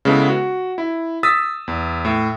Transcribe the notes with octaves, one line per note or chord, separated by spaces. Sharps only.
C#3 G#3 B3 E4 A4
F#4
E4
D#6 E6 A6 B6
E2
A2